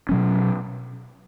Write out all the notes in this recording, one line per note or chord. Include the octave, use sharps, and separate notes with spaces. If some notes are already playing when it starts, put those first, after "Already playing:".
B2 F#3 C#4